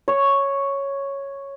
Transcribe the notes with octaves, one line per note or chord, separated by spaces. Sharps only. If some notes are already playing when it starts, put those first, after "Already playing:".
C#5